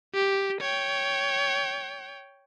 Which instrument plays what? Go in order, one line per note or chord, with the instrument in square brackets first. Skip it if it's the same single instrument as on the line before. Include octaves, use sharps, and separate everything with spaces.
[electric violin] G4
C#5 G5